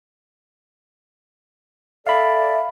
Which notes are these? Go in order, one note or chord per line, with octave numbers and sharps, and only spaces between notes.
A4 D5 E5 F5 B5